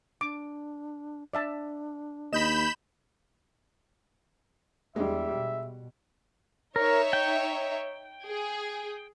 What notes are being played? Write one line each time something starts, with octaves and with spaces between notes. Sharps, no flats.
D4 D6
D4 D5 E5 A5
D#2 D#5 B5 G6 E7
E2 G3 G#3 D4 E5
B2
D#4 A#4 C#5 E5
G5
G#4